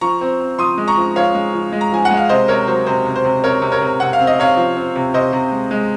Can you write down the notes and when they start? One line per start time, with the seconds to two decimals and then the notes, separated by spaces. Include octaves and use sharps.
0.01 F3 A#5 C#6
0.21 C4
0.40 C4
0.59 F3 C6 D#6
0.78 G#3
0.87 A#5 C#6
0.97 F3
1.16 F3 C#5 F5
1.35 G#3
1.53 F3
1.72 G#3
1.81 A#5
1.92 F3 G#5
2.05 F#5
2.11 G#3
2.17 F5
2.29 C3 C5 D#5
2.48 C3 A#4 C#5
2.68 F#3 C5
2.86 C3 C5
3.05 C3
3.15 C5
3.25 C3
3.43 C4 A#4 C#5
3.62 C3
3.72 A#4 C#5
3.81 C3
4.00 C3 F#5
4.13 F5
4.19 C4
4.27 D#5
4.39 C3 C#5 F5
4.57 F3
4.76 C4
4.96 C3
5.14 C3 C5 D#5
5.33 C3
5.52 G#3
5.71 G#3